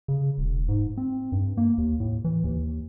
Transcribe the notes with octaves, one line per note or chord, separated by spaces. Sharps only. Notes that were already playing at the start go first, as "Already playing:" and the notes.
C#3
E1
G#2
C4
G2
A#3
D#2
A2
E3
D#2